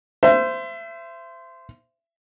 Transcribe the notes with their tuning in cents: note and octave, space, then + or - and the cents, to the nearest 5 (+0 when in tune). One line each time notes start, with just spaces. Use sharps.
C5 -15 E5 +30